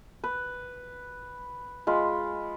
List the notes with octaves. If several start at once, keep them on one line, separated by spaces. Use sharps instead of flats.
B4
G#3 F4 B5